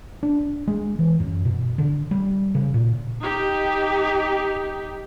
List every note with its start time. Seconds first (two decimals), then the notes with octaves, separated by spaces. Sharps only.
0.23 D4
0.67 G#3
0.99 E3
1.20 F#2
1.45 B2
1.78 D3
2.11 G3
2.55 C#3
2.74 A#2
3.21 D#4 G4